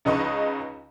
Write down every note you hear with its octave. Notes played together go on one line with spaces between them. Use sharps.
C#2 C#3 D#4 B4 D#5 C#6